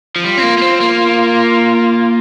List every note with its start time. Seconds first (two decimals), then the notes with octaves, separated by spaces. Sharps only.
0.16 F3
0.24 G3 F4
0.37 C4
0.43 A#3
0.58 A#3
0.62 C4
0.80 A#3